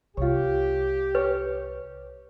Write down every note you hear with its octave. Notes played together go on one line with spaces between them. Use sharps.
C2 F4 G4 C#5
B4 C#5